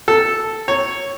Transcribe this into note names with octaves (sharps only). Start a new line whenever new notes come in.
A4
C#5